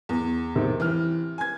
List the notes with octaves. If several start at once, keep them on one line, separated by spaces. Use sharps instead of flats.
E2
C3 D#3
E3 F6
G#5 G#6